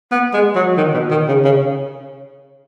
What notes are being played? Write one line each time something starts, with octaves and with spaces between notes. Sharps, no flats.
B3
G#3
F#3
D#3
B2
D#3
C#3
C#3